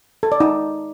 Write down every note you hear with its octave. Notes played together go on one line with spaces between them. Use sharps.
A4
D5
D#4